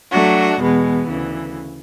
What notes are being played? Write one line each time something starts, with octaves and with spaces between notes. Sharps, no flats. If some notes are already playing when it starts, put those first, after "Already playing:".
F#3 A3 D4 F#4
E2 B2 G#3 B3
D2 C#3 E3